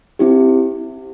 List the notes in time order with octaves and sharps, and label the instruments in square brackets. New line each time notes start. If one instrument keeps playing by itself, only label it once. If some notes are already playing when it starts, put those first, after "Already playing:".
[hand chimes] C4 E4 G4